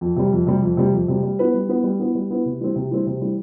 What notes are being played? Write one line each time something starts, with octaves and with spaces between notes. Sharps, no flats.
F2
C3 G3
F2
C3 G3
F2
C3 G3
F2
C3 G3
G3
B3 E4 B4
G3
B3 E4 B4
G3
B3 E4 B4
G3
B3 E4 B4
C3
E3 G3 C4
C3
E3 G3 C4
C3
E3 G3 C4